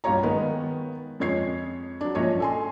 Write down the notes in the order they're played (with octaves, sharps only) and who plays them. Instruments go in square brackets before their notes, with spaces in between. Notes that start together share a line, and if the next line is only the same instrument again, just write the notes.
[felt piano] B1 G2 F4 G4 C#5 A#5
D#3 G#3 B3
F2 G#3 C#5 G#6 C7
F#3 D4
A#1 C#4 C#5 D#5
A4 G#5 C6